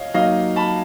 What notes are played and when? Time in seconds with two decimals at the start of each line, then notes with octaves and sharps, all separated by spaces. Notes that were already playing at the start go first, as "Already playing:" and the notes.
Already playing: C#5 D#5 F5
0.14 F#3 A#3 D#4 F#4 D#5 F5
0.56 A5 B5